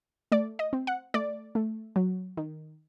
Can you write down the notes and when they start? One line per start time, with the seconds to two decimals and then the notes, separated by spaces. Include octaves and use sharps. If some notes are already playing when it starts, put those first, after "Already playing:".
0.32 A3 D5
0.59 D#5
0.73 C4
0.87 F#5
1.14 A3 D5
1.55 A3
1.96 F#3
2.37 D#3